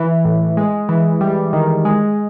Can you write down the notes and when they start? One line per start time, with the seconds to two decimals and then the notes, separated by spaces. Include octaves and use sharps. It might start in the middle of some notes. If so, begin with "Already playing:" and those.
Already playing: E3
0.25 A2
0.57 G#3
0.89 E3
1.21 G3
1.53 D#3
1.85 G#3